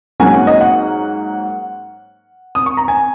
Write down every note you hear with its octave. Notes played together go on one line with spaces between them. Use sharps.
G#2 F#3 A#3 C#4 G#5
F#5
D#5
F#5
D#6
C#6
A#5
G#5